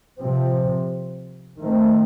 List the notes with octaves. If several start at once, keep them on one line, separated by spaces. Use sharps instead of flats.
C3 F3 C4
D#3 A3 C4